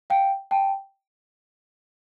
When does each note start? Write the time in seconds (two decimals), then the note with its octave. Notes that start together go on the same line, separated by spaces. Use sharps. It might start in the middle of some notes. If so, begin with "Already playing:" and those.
0.10 F5 G5
0.51 G5 A5